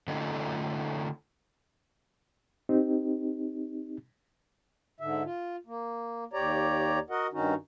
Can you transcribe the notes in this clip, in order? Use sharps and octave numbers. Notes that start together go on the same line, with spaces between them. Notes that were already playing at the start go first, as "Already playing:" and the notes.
D3 A3 C#4 D#4 F4 A4
C4 D#4 G4
G#2 D3 E5
F4
A#3
D#2 G4 C#5 D5 A#5
F#4 A#4 D#5 F#5
G2 D#3 C#4 D#4 F#4